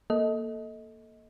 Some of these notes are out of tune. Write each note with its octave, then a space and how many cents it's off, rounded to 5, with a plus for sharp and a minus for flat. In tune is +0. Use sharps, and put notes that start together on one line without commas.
A#3 +0 A4 +0 D#5 +25